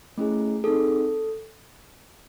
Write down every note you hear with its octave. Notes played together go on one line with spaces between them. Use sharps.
A3 C#4 E4 G#4
C4 D#4 G#4 A4